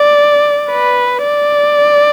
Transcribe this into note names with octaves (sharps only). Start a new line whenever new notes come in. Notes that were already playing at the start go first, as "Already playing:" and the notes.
Already playing: D5
B4
D5